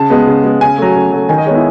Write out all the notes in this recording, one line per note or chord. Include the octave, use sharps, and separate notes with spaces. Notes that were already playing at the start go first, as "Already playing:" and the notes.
Already playing: C#3 A5
G#3 B3
C#3
G#3 B3
C#3 G#5
F#3 A3
C#3
F#3 A3
D#3 G#5
D#5
G#3 B3 C#5
E4